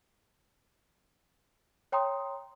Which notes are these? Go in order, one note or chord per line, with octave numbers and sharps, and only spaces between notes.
C#5 G5 A#5 C6 D#6